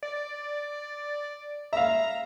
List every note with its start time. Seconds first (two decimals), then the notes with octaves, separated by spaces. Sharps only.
0.03 D5
1.73 E5 F5 A#5